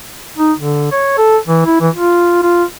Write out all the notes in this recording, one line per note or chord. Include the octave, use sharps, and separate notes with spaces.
D#4
D3
C#5
A4
E3
E4
E3
F4
F4